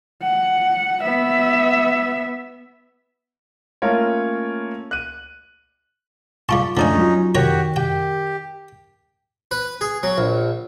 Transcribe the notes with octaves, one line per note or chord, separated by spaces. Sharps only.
F#5
B3 E5
A3 A#3 C#4 F4 A#4 C#5
F#6 D#7
G3 F4 A5 C#6 D6
D2 F3 C#4 D#4 D5 G#5
F#3 F4
D#3 F#4 G4 C#5 A#5
G4 G5
B4
G#4
F#3
A#1